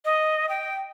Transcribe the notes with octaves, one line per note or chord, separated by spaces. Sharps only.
D#5
G5